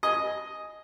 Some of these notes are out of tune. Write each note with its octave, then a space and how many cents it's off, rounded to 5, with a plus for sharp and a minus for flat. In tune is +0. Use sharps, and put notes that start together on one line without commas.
D#5 +0 G#5 +0